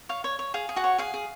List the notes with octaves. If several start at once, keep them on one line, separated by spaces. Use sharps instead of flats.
C#5 F5
C#5
C#5
G#4 F5
G#4
F#4 F#5
C#5
G#4 F5
G#4